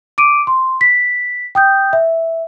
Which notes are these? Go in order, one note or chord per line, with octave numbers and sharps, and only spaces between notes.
D6 D7 D#7
C6
B6
G5 D#6 G6
E5